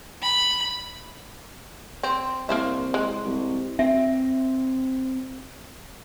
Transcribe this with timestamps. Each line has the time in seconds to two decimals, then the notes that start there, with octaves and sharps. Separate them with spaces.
0.22 B5
2.03 C4
2.49 C2 A#3 C5 E5
2.94 G#3
3.25 C2
3.79 C4 E5